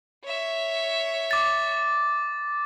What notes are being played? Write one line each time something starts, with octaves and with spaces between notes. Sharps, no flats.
C#5 E5
D6 A6